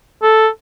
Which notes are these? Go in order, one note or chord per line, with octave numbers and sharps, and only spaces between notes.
A4